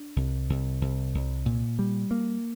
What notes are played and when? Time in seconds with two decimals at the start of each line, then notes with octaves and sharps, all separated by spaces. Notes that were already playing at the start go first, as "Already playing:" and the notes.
Already playing: D4
0.16 C2
0.49 C2
0.81 C2
1.14 C2
1.46 A#2
1.79 G3
2.11 A#3